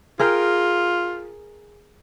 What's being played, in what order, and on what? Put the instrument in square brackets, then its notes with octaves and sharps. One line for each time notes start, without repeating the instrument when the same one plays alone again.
[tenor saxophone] F4 [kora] G#4 A#4 G5